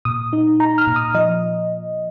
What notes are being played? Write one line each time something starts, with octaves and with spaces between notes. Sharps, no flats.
A#2 D#6
D#4
D#4 A#5
F6
A#2
D#6
F3 D#5